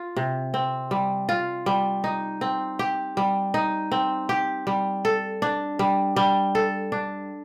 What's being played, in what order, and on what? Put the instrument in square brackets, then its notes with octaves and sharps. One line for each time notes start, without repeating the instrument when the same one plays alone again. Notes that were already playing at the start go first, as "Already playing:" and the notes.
Already playing: [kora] F4
C3
C4
G3
F4
G3
D#4
C4
G4
G3
D#4
C4
G4
G3
A4
D4
G3
G3
A4
D4